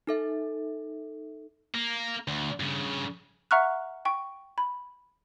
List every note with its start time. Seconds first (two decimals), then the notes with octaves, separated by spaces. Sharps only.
0.07 D#4 A4 E5
1.75 A#3
2.28 D2
2.60 G2 C#3
3.51 E5 F#5 A#5 C#6 F6 F#6
4.05 G5 C#6
4.58 B5